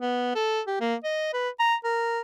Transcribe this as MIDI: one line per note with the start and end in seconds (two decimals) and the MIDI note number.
0.01 0.33 59
0.35 0.61 69
0.67 0.76 67
0.81 0.95 58
1.04 1.33 75
1.33 1.50 71
1.60 1.75 82
1.84 2.20 70